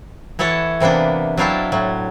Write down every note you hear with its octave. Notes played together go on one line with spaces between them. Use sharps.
E3 E4 A4 C#5 F#5 A5
C3 E3 A#3 B3 D4
F#3 D4 E4 F5 G5 A5
A2 F#3